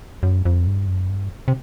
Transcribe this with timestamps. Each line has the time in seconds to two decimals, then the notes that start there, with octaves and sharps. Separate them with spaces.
0.23 F#2
0.45 F2
0.67 G2
0.88 F#2
1.09 G2
1.48 C3